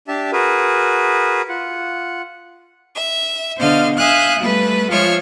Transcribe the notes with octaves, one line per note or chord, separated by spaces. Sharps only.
D4 G4 E5 A5
F#4 G#4 A#4 B4
F4 F#5
E5
B2 D3 C5 D#5 F5 F6
E5 F5 G#5 D#6 F#6 G6
G3 A3 B4
F3 G#3 F4 C#5 E5 F6